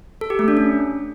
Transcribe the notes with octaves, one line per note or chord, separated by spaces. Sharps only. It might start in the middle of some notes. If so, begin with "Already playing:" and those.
A4
G4
A3
D4
C#4